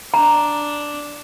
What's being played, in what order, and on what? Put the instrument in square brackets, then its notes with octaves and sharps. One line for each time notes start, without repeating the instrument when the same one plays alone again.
[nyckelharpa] D4 [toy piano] A#5